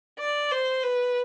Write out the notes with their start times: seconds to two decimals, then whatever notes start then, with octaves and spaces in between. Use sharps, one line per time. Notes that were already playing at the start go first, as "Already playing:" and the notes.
0.19 D5
0.51 C5
0.83 B4